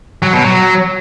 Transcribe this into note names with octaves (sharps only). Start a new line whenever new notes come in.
F#3
B2
F#3